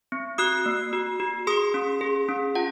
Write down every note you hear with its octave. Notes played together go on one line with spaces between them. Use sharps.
C4
F#4 D#6 F#6
A#3
F#4
F#4
G#4 C6 D#6
C#4
G#4
C#4
F4 F#5